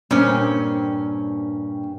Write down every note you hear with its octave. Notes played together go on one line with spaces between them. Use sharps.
G2 A#2 C4 C#4